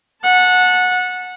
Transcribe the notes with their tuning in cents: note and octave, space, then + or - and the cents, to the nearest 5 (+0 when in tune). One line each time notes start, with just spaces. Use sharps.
F#5 -20 A5 +0